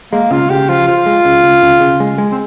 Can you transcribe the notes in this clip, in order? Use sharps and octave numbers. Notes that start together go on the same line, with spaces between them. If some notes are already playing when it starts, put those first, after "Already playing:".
G#3 A#3
C#3 F4
C#3 G4
F3 F4
F3 F4
G#3
C#3
C#3
C#3
C#3
G#3
G#3
C4